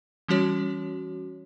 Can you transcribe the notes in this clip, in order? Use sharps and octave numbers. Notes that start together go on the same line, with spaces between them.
E3 G3 C#4 F#4 C#5